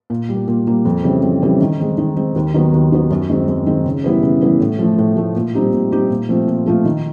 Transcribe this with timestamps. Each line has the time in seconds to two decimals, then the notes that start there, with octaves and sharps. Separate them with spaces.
0.10 A#2
0.29 G3 A#3
0.48 A#2
0.67 G3 A#3
0.85 F2
1.04 C#3 E3 G3 C4
1.23 F2
1.42 C#3 E3 G3 C4
1.61 D#3
1.79 G#3 C4
1.98 D#3
2.17 G#3 C4
2.36 D#2
2.54 D#3 F#3 B3
2.73 D#2
2.92 D#3 F#3 B3
3.11 F#2
3.29 D#3 G#3 C4
3.48 F#2
3.67 D#3 G#3 C4
3.86 C#3
4.04 E3 G3 B3 E4
4.23 C#3
4.41 E3 G3 B3 E4
4.60 A2
4.79 F3 A3
4.98 A2
5.16 F3 A3
5.36 A#2
5.54 G3 C4 D#4 G4
5.73 A#2
5.92 G3 C4 D#4 G4
6.10 A#2
6.29 F3 A3 C4 F4
6.48 A#2
6.66 F3 A3 C4 F4
6.85 D#3